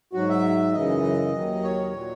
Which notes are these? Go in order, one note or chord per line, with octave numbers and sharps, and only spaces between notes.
G#2 F#3 F#4
E5
F#2 C#3 E3 D#5
D#2 D#3 F#3
C#5
A#2 F#3